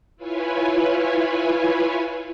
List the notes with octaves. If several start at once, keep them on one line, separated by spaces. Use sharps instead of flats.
E4 F4 B4 C#5 G#5